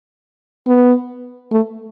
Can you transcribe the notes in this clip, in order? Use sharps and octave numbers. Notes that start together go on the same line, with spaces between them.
B3
A3